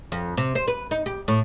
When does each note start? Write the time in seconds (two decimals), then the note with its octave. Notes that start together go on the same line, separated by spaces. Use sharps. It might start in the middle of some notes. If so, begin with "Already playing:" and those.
0.12 F2
0.37 C3
0.55 C5
0.68 B4
0.91 D#4
1.06 G4
1.28 A2